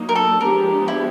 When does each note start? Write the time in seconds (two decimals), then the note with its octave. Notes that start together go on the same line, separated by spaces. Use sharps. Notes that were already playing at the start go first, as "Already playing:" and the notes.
Already playing: F#3 A#3 D#4
0.09 A#4
0.15 A4
0.40 F3 G#3 B3 D4 G4 A#4
0.88 E4